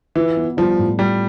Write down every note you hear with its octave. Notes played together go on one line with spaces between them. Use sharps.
E3 F4
B3
F3 G3
A2
G3 F4